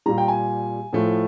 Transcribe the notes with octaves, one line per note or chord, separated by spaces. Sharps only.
A#2 G3 A#5
G5
G#5
A2 F3 A3